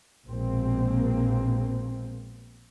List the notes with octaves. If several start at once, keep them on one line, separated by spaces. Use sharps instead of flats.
A#1 B2 G#3 A#3 C4